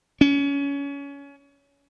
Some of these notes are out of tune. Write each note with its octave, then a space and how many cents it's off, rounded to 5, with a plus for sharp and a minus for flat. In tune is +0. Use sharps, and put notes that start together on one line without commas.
C#4 +25